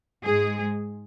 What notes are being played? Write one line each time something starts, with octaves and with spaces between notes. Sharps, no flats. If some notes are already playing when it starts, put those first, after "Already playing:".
G#2 G#3 G#4